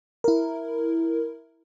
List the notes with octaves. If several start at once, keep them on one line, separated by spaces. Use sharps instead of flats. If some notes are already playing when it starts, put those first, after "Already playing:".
E4 A#4